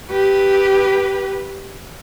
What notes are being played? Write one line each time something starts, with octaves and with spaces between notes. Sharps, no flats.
G4 B4